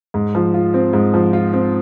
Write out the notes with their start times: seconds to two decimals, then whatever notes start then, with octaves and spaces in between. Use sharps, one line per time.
0.14 G#2
0.35 F3
0.54 F4
0.74 C4
0.93 G#2
1.14 F3
1.33 F4
1.53 C4